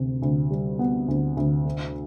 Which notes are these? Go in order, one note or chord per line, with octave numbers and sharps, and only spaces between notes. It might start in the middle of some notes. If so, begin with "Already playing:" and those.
Already playing: D2 C3
D2
G3
B3
D2
D2
D3